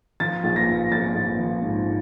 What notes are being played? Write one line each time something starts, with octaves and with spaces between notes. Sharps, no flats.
F3 A6
A#1
A#6
F3
A#1 A6
A#1
F3
G#2